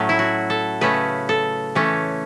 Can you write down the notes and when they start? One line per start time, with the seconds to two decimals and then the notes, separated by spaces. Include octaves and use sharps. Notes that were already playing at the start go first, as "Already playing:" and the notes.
Already playing: A2 F#3 A3 C#4
0.09 E4
0.19 F#4
0.50 A4
0.81 C#3 A3 C#4 B4
1.29 A4
1.75 E3 A3 C#4